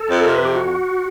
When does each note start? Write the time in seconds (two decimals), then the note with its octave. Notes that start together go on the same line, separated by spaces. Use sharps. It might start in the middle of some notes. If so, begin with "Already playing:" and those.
Already playing: A4
0.10 F2
0.24 C3 A#4
0.35 B4
0.40 F2 G4
0.56 F#4